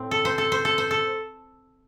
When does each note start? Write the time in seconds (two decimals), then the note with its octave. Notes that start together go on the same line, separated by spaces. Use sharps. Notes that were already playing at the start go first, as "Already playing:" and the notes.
Already playing: A2 C4
0.11 A4
0.25 C5
0.38 A4
0.52 C5
0.65 A4
0.78 C5
0.91 A4